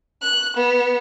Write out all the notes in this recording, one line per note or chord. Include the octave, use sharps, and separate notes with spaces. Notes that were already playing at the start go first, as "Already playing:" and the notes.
F#6
B3